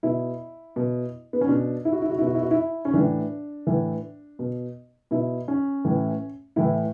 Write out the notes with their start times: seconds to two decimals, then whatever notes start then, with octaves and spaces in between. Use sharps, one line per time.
0.03 B2 E4
0.76 B2
1.33 B3
1.41 C#4
1.48 B2 D4
1.85 E4
1.93 F#4
2.02 E4
2.10 F#4
2.18 B2 E4
2.27 F#4
2.35 E4
2.42 F#4
2.51 E4
2.85 C#4
2.94 A2 E3 D4
3.67 A2 E3
4.39 B2
5.11 B2 E4
5.48 C#4
5.85 A2 E3
6.56 A2 E3 E4